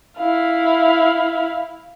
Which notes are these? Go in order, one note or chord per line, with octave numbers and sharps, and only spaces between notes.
E4 F5